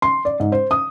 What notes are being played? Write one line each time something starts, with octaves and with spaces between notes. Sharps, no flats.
C6
D5
G#2
C5
D#6